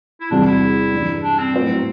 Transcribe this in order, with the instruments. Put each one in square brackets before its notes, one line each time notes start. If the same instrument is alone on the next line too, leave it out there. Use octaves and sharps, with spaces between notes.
[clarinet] E4
[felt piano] E2 C3 G3 C4 F#4 [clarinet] D4
[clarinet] E4
[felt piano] G2 E3 G3
[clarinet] D4
C4
[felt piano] A2 F#3 B3 F#4 C5